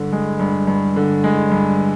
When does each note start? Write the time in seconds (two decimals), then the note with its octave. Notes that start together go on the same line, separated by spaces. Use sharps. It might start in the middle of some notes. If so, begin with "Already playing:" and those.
Already playing: G2 D3
0.12 G#3
0.39 G2
0.67 G2
0.96 D3
1.24 G#3
1.51 G2